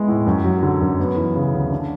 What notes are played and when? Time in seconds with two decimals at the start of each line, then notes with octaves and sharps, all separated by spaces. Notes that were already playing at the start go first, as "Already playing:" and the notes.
Already playing: G#3 B3 E4
0.08 A2
0.26 F#2
0.44 F#3
0.63 D3
0.81 F#2
0.99 B3
1.17 E3
1.36 C#3
1.54 D2
1.72 D4